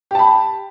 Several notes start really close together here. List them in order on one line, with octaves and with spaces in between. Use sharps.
G4 A5 B5